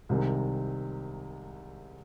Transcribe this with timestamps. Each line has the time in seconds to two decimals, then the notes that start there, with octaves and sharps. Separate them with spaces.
0.09 C2 C3 D#3 G#3